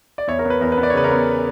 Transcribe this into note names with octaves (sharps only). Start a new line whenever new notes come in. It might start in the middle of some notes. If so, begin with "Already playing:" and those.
D5
E2 C#5 E5
A#4 C#5
B3
B4
E2 A#4
B4
B3
D5
C#5
C#3 B4
A#4 C#5
B3